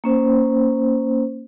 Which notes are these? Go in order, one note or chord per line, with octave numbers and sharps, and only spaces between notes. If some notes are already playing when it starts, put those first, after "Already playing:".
A#3 C#4 C5